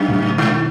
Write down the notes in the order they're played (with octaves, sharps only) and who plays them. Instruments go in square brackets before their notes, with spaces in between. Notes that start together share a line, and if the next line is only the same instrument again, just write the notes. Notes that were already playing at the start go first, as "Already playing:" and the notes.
Already playing: [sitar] F#2
[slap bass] A2 C#3
[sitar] G#2 [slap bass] B2 D#3